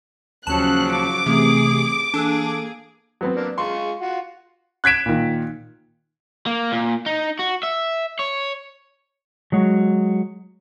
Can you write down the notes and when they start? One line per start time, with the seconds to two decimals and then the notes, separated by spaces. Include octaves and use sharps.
0.47 D#2 C#3 F3 F#3 C#4 A5 F#6 C#7
0.94 D6
1.26 C3 E3 A3 C4 G#4
2.14 E3 A#3 D4 G#4 A4 E6
3.21 F#3 B3 C4
3.35 A#3 D4
3.58 G#3 F4 C6 C#6
4.01 F4 F#4
4.84 F#6 G#6 B6 D7 E7
5.06 A#2 D#3
6.47 A#3
6.72 A#2
7.06 D#4
7.39 F#4
7.63 E5
8.19 C#5
9.52 F#3 G#3 F#4